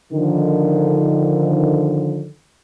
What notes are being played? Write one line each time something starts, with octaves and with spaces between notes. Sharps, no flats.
D3 D#3 F3